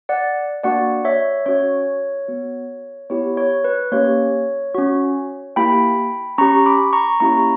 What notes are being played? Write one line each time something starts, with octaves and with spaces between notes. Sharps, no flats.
D5 F#5
A#3 D4 F#4 D5 F#5
C#5 E5
C#4 F#4 C#5
B3 F#4
B3 E4 G4 C#5
C#5
B4
A#3 C#4 G4 C#5
C#4 F#4
A#3 E4 G4 G5 B5
C#4 G4 A#5 C#6
B5 D6
A#5 C#6
A#3 C#4 E4 G4 A#5 C#6